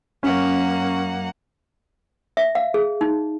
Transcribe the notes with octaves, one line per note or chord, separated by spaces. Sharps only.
F#2 A#3 C#4 F#5
E5
F5
G#4
D#4